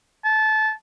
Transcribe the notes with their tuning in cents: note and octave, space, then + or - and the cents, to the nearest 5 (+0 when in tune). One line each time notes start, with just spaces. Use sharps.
A5 -20